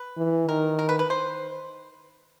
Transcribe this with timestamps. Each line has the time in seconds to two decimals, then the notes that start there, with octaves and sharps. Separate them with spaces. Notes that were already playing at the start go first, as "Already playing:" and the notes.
Already playing: B4
0.17 E3
0.48 D#3 A#4
0.79 A#4
0.89 B4
0.99 B4
1.10 C5